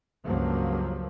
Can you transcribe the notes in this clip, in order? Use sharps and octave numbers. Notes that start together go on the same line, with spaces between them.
C#2 G2 F3 F#3 A#3